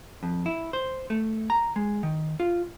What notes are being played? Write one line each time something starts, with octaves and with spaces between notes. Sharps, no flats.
F2
E4
C5
A3
A#5
G#3
D#3
F4